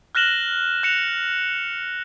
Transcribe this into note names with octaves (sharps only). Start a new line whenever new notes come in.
F6 F#6 A#6 E7 F#7 G7
F#6 C#7 E7 F7